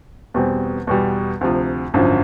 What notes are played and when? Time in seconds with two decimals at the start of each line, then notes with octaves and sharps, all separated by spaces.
0.34 E2 B2 G3 C4
0.87 E2 B2 G3
1.41 D2 C3 F3
1.94 G#1 F#2 D3 F3